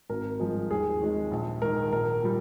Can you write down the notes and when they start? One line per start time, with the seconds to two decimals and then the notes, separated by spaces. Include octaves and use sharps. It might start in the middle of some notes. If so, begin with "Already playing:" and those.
0.09 G#1 A#4
0.40 G2 F3 G#3
0.70 D#2 G#4
1.01 D#3 G#3
1.31 A#1
1.62 G#2 D#3 A#4
1.92 A#1 A#4
2.23 A#2 G3